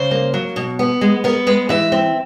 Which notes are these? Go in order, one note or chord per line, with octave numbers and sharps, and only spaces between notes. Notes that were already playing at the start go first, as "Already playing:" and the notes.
Already playing: C#3 C5
A#3
F#3
B2
B3
G#3
B3 A#4
G#3 B4
E3 E5
C4